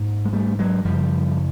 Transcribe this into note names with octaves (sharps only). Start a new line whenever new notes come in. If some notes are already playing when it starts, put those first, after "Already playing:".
Already playing: G#2 A#3
G#3
G3 A3
F#3 G#3
F#2 C#3 F3 G3